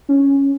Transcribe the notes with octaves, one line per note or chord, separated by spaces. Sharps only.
C#4